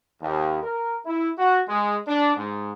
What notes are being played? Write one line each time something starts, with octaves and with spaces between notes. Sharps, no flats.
D#2
A#4
E4
F#4
G#3
D4
G#2